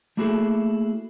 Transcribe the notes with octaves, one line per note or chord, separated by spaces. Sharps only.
A3 A#3 E4 F#4 G#4 A4